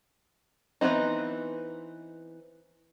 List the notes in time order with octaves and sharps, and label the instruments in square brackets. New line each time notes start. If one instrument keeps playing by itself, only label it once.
[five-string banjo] E3 F#3 B3 C4 D#4